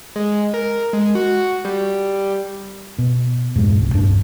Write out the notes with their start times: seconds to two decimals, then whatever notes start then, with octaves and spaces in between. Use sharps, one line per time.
0.16 G#3
0.54 A#4
0.93 G#3
1.15 F#4
1.65 G3
2.98 B2
3.56 E1 G2 A#2 G#3
3.80 C2
3.94 D1 G2 D4